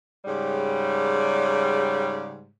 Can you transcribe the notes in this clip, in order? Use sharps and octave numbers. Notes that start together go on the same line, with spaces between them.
G#2 C#3 G3